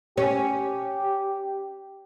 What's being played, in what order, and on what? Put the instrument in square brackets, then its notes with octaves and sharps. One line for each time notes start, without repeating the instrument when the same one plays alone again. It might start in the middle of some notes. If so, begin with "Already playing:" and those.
[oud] C#4 [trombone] G4